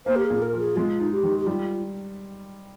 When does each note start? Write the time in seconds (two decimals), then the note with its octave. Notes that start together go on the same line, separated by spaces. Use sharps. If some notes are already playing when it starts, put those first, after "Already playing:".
0.06 A#3 C5
0.16 G4
0.24 G#4
0.30 A#2
0.42 A#4
0.53 F3
0.59 G#4
0.76 G#3 F4
1.00 D#4
1.12 G4
1.23 D#3
1.39 G4
1.46 G3 F4